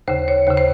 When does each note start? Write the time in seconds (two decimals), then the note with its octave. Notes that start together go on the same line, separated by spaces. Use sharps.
0.08 D#2 C#3 C5
0.28 C#5
0.47 D#2 C#3 C5
0.57 C5